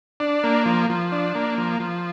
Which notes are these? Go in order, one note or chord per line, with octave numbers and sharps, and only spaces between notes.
D4
A#3
F3
F3
D4
A#3
F3
F3